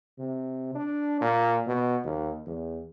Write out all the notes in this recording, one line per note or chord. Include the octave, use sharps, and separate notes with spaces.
C3
D4
A#2
B2
D#2
E2